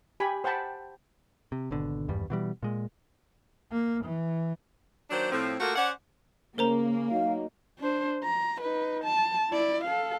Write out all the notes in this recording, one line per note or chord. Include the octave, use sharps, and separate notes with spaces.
G4 G#5 B5
C5 F#5 G5 A5 B5
C3
G#1 B2 D3
G#1 E2 G2 G3
B2 E3 G3
A#2 G#3
A#3
E3
D#3 F#3 A#3 D4 C5
A2 F3 C4
A3 A#3 F4 F#4 A4 A#4
C#4 C5 D5 F#5
C#3 A#3 A#4 C5 A#5
F#3 D#4 F5
D4 C5
A#5
D#4 B4
A5
E4 D5
A4 F5